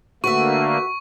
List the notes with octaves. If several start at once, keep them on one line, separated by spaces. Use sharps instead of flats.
D3 A3 A#3 F#4 B4 E5 C#6